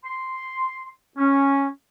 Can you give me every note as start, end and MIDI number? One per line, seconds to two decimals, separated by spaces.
0.04 0.88 84
1.18 1.68 61